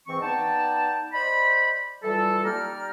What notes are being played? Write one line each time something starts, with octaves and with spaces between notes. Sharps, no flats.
G#2 E3 C4 C#6
B3 D#4 D5 G5 A5
C5 D5 D#5 B5
E3 G3 F4 A4
G3 A#3 D#4 D5 A#5 F6